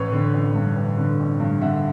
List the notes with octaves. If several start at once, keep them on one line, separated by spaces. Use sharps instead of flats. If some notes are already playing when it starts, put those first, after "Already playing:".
Already playing: A1 B4 C#5
D3
A1
G2
A1
D3
A1
G2
D3 E5 F#5